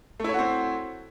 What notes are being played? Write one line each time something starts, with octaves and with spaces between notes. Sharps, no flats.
A3 C4 E4 F#4 C#5